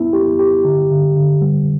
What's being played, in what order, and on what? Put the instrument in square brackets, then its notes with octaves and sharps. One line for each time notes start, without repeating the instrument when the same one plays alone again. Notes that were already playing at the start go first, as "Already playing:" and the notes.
Already playing: [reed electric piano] B3 E4
G4
G4
D3
D3
D3
G3